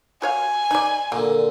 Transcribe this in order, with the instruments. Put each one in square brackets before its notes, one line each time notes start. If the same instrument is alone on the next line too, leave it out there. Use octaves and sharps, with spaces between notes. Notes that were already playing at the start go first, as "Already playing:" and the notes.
[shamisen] F#4 C#5 F5 [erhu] G#5
[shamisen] D#4 D5 [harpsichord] B5
[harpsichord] A#2 D3 [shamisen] A#3